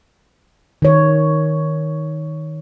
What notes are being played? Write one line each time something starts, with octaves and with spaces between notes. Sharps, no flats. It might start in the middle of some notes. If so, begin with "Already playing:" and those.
D#3 C#5